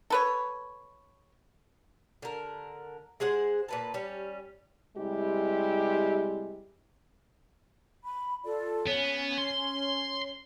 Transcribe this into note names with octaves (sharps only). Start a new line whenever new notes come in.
A4 B4 C#5
D3 A#4
G#3 G#4 C5 F#5
A#2 B4 A5
G3 C#4
C3 G3 G#3 E4 G4
B5
F4 A4 D5
B3 C#4 C#5
C6